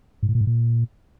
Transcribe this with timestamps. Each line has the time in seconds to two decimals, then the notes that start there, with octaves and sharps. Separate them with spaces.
0.23 G#2
0.29 A2
0.35 A#2
0.41 G#2
0.47 A#2